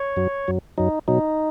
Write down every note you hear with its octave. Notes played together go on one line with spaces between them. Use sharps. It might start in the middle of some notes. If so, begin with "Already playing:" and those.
Already playing: C#5
F#2 F#3
F#2 F#3
F#2 F#3 D#4
B2 F#3 D#4